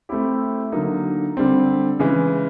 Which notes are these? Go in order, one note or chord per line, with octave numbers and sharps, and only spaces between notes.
A3 C4 E4 G4
D3 F#3 A#3 D#4
D3 G3 C4
C#3 E3 G#3